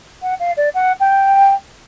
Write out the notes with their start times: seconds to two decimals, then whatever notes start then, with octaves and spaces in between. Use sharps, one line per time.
0.22 F#5
0.40 F5
0.57 D5
0.74 F#5
1.00 G5